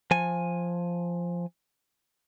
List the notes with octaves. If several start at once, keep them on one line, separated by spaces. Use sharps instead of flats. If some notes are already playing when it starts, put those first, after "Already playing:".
F3 G#5